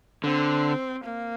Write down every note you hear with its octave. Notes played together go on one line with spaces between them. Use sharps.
D3 C4
A#3